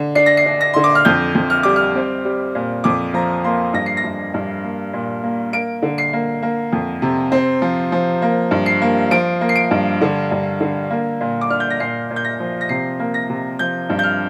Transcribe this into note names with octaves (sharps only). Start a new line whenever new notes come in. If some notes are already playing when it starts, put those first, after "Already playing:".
Already playing: D3
D4 C7
A#6
C7
D4
A#6
D3 C6
D6
F6
F2 G6
F2
F6
G3 D6
F6
C4
G3
A#2
F2 D6
F3 A#5
A#3 C6
G2 A#6
C7
A#6
G2
G2
A#3
A#2
A#3
A#3 D7
D3
C7
A#3
A#3
F2
C3
C4
F3
F3
A#3
G2
C7
A#3
F3 D7
A#3
C7
D7
G2
D3
G2
D3
A#3
A#2
D6
D4 F6
G6
A#6
A#2 C7
A#2
G6
A#6
F3
A#6
C3 C7
A#3
A#6
C3
F3 G6
G2
G6
F6